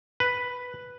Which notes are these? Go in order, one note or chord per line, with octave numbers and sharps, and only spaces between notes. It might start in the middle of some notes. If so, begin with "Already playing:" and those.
B4